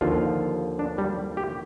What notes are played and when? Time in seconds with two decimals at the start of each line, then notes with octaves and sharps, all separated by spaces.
0.01 D#2 D3 F3 F4
0.79 D4
0.98 G3
1.37 G4